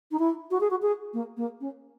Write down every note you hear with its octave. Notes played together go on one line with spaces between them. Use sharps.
D#4
E4
F#4
G#4
F#4
G#4
A#3
A#3
C#4